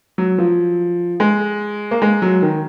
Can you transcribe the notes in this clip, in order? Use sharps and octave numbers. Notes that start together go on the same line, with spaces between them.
F#3
F3
G#3
A#3
G#3
F#3
D#3